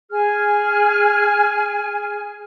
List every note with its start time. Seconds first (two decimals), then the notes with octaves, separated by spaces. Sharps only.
0.11 G#4 G#5 F6